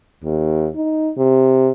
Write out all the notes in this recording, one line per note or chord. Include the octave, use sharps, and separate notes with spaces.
D#2
D#4
C3